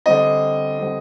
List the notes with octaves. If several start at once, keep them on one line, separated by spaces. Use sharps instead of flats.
D3 G3 C4 D#5
D3 G3 C4